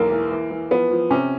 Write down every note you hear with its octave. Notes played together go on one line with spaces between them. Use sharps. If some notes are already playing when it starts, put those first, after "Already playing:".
Already playing: B1 E2 A#3
E3
E3
E3
F3 B3
F3
C3 C#4